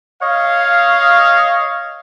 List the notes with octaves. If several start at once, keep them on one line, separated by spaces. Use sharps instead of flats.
C#5 D#5 F5